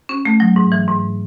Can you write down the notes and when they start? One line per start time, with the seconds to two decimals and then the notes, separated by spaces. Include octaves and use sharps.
0.09 C#4
0.25 A3
0.40 F#3
0.56 G#2
0.72 E3
0.88 G#2